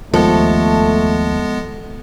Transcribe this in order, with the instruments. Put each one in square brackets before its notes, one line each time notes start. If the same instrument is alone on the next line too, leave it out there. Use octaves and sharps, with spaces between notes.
[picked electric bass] D#2 F3 [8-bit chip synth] G#3 B3 [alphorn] A3 [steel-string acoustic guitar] A4